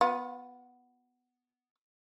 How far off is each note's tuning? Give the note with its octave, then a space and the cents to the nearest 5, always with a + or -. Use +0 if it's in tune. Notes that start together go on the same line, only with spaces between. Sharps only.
B3 +5 F4 +40